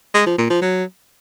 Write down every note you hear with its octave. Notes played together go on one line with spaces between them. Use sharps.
G#3
F3
A#2
F3
F#3